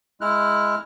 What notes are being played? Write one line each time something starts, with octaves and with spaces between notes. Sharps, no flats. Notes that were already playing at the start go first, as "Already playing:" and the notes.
G#3 E4 F6 F#6